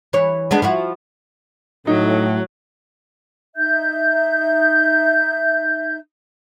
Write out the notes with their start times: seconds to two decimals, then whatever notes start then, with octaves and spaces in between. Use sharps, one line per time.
0.13 E3 C#5
0.51 G#3 B3 D4
0.62 F3 E4 F#4
1.87 A2 F#3 D#4
3.56 D#4 E5 G6